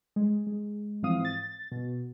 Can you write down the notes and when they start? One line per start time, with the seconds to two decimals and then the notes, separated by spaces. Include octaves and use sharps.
0.16 G#3
0.47 G#3
1.02 G#2 E3 F3 C4 F5 D#6
1.25 A6
1.72 B2